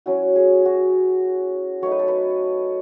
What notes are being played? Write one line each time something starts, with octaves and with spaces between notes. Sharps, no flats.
F#3 C#4 E4 F#4
G#4
F#4
F#3 A3 D#4 C#5
B4
A4
B4